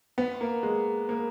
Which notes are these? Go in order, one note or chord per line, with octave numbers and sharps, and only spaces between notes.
B3
A#3
G#3
A#3